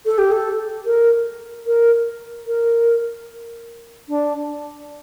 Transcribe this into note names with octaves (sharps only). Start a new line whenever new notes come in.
A4
G4
A4
A#4
A#4
A#4
D4